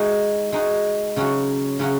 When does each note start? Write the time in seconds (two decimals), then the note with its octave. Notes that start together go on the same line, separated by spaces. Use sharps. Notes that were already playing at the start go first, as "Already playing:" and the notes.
Already playing: G#3 D#4 F#4
0.52 G#3 D#4 F#4
1.16 C#3 F#3 C#4 F#4
1.79 C#3 F#3 C#4 F#4